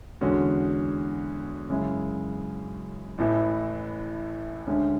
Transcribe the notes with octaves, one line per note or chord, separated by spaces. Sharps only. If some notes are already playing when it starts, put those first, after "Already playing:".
E2 D3 G#3 C#4 F#4
F#2 C#3 G#3 C#4 E4
A1 A2 E3 A3 E4
D2 D3 G#3 C#4